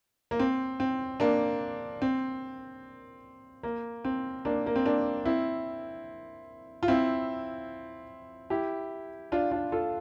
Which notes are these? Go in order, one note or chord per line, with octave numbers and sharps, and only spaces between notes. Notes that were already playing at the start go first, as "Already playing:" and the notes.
A#3
C4
C4
A#3 D4
C4
A#3
C4
A#3 D4
A#3
C4
A#3 D4
C4 E4
F4
C4 E4
E4 G4
D4 F4
D4 F4
F4 A4